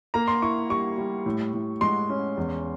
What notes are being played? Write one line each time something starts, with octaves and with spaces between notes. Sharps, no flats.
A#3 A#5
C6
E4 C#6
G3 C#6
G3
A2
A2
G#3 C6
C#4
E2